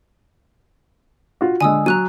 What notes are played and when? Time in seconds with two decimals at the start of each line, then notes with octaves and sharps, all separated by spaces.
1.41 F4 F#4
1.61 D3 G#3 G#5 D#6 E6
1.86 F#3 A#5 F#6 D#7